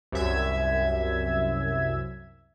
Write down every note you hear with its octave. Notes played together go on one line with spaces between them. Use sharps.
C2 F#2 E5 G#6